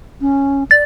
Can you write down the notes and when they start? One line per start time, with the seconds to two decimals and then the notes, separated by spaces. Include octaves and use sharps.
0.21 C#4
0.71 D5 A6